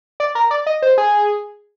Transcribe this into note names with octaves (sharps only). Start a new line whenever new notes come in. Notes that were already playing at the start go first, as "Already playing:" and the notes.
D5
A#4
D5
D#5
C5
G#4